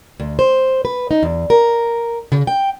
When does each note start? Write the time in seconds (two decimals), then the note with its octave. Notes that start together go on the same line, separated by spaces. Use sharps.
0.20 D2
0.39 C5
0.85 B4
1.11 D#4
1.23 E2
1.50 A#4
2.32 C#3
2.47 G5